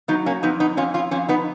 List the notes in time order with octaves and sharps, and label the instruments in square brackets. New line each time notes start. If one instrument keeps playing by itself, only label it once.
[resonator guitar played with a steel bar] F#3 B3 D#4
A#3 C#4
F2 B3 D#4
B3 D#4
F2 C#4 F4
C#4 F4
F2 C#4 F4
B3 D#4